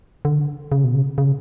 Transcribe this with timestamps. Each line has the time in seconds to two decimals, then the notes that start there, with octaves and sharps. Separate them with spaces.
0.25 D3
0.72 C#3
0.84 B2
0.95 C#3
1.18 C#3